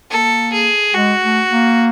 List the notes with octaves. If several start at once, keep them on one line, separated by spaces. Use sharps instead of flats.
A#3 A4
G#4
G#3 F#4
A3
A#3